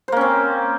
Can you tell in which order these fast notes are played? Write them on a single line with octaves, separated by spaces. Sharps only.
C5 A#3 C#4 C4